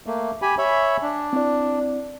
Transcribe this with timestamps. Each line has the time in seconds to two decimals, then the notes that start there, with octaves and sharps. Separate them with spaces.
0.06 A3 A#3
0.42 G4 G#5 B5
0.58 C#5 E5 G#5 B5
1.02 D4
1.33 C4 E4 D5